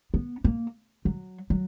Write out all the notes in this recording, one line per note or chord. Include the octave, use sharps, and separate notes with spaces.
B3
A#3
F#3
F#3